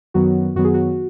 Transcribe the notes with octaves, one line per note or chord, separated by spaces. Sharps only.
F#2 D#3 F#3 B3 F#4
F#2 D#3 F#3 B3 F#4
G#4
F#4